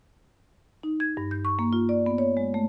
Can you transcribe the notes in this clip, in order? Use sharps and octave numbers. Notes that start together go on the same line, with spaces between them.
D#4
G#6
G2
G6
C#6
A#3
F4
D5
B3
C#5
G#3
A3